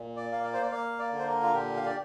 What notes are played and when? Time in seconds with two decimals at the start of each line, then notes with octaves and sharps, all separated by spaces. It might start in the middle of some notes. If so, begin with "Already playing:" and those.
Already playing: A#2
0.17 D5
0.30 A#3 F5
0.44 D5
0.53 C5
0.63 D5
0.71 A#3 F5
0.99 D5
1.12 D3
1.19 C5
1.27 A#4
1.43 F4
1.53 A#2 G4
1.77 F5
1.86 D5